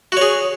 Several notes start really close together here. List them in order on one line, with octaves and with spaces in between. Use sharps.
F#4 C#5 G#4